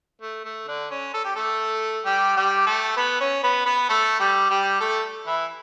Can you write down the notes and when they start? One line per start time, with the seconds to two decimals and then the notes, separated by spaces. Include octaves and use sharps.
0.21 A3
0.45 A3
0.67 D3 D4
0.90 C#4
1.14 A4
1.24 G4
1.35 A3 A4
2.05 G3 G4
2.36 G3 G4
2.66 A3 A4
2.97 B3 B4
3.20 C#4 C#5
3.43 B3 B4
3.65 B3 B4
3.89 A3 A4
4.19 G3 G4
4.50 G3 G4
4.80 A3 A4
5.27 E3 E4